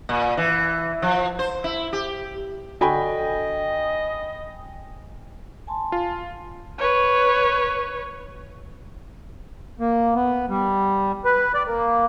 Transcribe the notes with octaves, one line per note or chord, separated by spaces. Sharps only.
A#2
E3
F3
C5
E4
G4
D3 F#4 D5 D#5 G5 G#5 B5
G#5 A5 C6
F4
B4 C#5
A#3
B3
G3
B4
D5
A#3